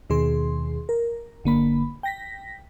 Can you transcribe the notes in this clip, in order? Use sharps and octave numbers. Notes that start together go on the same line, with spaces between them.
D#2 B2 D#3 G#4 C6
A#4
G1 D3 A#3 B5
G5 A#6 B6